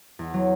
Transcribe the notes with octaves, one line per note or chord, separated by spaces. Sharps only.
E2
F#3